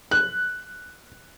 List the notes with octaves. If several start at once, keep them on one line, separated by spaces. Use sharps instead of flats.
F#6